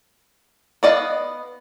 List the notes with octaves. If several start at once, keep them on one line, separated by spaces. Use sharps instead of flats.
B3 D5 D#5 F5